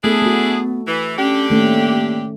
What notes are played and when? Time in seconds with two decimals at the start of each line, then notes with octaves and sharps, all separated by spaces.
0.04 A3 B3 D4 E4 G#4 A4
0.22 A3 F#4
0.88 E3
1.18 D3 C#4 D4 G4
1.50 D#3 A3 A#3 C#4